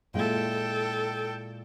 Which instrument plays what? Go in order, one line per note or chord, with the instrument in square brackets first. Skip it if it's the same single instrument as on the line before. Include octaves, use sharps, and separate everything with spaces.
[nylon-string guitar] A#2 G#3 E4 [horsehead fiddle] A4 G5